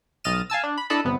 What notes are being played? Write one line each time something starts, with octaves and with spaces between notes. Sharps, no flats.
B1 D#5 F6 A6 D#7 E7
F5 G#5 A5 E6
D4
B5
D4 E4 A4 D#5 A5 B5
G1 C3 B3